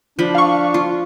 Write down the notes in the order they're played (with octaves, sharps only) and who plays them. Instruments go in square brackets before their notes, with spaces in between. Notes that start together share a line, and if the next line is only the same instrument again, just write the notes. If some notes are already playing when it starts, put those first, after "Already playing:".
[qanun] F3 B5 [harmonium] D4
[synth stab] F5 C#6
[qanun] F4